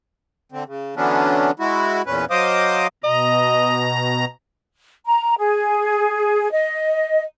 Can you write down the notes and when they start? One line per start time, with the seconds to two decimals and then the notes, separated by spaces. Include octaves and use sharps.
0.52 D3 C4
0.67 C#3
0.96 D3 E3 F#3 B3 C#4 D4
1.59 G#3 E4 F#4
2.06 E2 A#2 C#4 B4
2.30 F#3 C5 D#5 F5 D6 D#6
3.04 B2 D#5 A#5
5.06 A#5
5.39 G#4
6.52 D#5